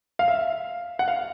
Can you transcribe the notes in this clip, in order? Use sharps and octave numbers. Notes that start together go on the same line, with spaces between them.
F5
E5
F#5
F5